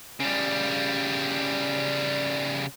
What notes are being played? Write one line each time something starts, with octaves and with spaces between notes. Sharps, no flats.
C#3 G3